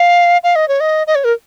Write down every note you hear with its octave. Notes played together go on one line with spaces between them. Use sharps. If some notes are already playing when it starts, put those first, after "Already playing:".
Already playing: F5
F5
D#5
C#5
D#5
D#5
C#5
A#4